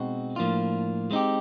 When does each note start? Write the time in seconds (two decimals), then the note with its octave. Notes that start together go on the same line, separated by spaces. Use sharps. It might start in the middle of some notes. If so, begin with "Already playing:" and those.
Already playing: B2 G#3 C4 D#4 F#4
0.36 A2 F3 A#3 D4 F4
1.11 G#3 C4 D#4 G4